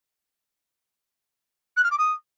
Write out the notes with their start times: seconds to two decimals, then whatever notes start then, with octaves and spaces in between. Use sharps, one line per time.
1.77 F#6
1.84 F6
1.91 D6
1.98 D#6